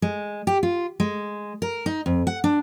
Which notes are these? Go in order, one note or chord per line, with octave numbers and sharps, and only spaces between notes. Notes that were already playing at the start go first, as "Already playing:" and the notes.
G#3
G4
F4
G#3
A#4
D#4
F2
F#5
D4